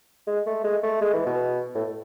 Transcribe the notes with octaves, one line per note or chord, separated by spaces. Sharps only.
G#3
A3
G#3
A3
G#3
E3
B2
A2